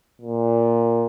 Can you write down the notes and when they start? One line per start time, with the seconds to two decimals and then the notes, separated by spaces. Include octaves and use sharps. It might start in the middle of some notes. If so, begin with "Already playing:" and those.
0.21 A#2